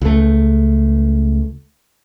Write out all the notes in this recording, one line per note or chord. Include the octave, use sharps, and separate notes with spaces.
C#2 A3